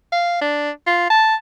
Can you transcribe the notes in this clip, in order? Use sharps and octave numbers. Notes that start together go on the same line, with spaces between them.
F5
D4
F4
A5